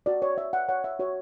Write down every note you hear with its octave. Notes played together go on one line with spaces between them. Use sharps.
F#4 D5
C#5
C#5 E5
F#5
C#5 F#5
E5
F#4 C#5